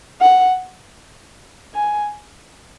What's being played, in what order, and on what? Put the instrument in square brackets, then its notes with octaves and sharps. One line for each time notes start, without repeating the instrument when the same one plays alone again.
[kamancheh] F#5
G#5